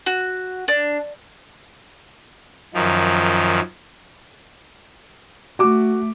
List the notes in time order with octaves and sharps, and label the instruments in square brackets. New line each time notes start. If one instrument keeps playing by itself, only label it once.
[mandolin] F#4
D4
[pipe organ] F#2 D#3 F3
[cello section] A3 [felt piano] F#4 D6